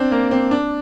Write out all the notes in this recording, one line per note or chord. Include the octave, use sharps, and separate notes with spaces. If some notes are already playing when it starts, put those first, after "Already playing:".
Already playing: C4 D4
A#3
C4
D4